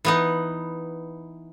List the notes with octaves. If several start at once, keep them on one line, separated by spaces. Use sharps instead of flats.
E3 B3 D#4